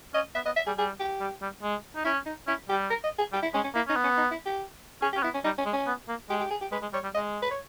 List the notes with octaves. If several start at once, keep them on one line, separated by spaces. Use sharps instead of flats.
C#4 D#5
B3 E5
B3 D#5
E5
G3 G#4
G3 G#4
G4
G3
G3
G#3
D#4
C#4 E4
D#4
C#4 E4
G3 G4
A#4
D#5
G#4
G3 G4
E4
G#3 C#4
C#4
A#3 E4
C#4 D#4
B3
C#4
D#4
E4
G4
C#4 G#4
G4
C#4
B3 E4
C#4
G3 D#4
C#4
G#3
C#4
B3
A#3
G#3 G4
G4
G#4
G4
G#3 B4
G#3
G3 C#5
G3
G#3 D#5
B4
C#5